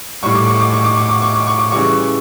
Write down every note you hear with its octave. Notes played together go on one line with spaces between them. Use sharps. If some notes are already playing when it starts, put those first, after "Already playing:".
A2 G3 C#6
D6
C#6
D6
C#6
D6
C#6
D6
C#6
D6
C#6
D6
C#3 E3 G3 C#6